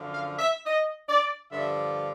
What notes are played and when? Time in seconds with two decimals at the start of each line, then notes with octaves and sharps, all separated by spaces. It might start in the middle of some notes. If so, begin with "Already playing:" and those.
Already playing: F#2 D3 F3
0.11 F5
0.39 E5
0.66 D#5
1.09 D5
1.51 G2 D3 F3 E5